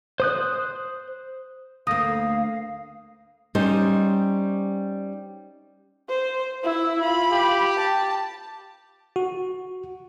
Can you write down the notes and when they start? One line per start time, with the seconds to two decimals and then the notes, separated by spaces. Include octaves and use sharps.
0.20 C5 D#6 F#6
1.87 D2 A#3 F5 D#6 A#6
3.55 G3 C#4 D#4 C5
6.09 C5
6.64 E4 E6
7.00 F4 B5
7.31 G4
7.77 A5
9.16 F#4